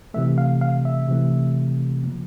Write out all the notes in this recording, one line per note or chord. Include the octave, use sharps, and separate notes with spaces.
C3 E3 A3 E5
F5
F5
E5
C3 E3 A3
C#3 F3 A#3